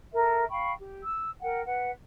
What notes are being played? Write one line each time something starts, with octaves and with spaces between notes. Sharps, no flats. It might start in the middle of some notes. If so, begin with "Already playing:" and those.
A4 A#4 E5
F5 G5 B5 C#6
G4
E6
A#4 F#5 G5
B4 F#5